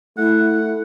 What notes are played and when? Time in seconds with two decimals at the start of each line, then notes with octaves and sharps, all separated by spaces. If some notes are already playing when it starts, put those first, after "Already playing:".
0.18 A3 E4 F#5